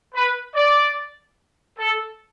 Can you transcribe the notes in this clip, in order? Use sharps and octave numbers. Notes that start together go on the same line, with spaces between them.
B4
D5
A4